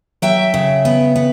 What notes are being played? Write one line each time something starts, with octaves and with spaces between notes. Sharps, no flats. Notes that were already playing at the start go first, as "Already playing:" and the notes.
F#3 E5 G5
C#3
B3
B3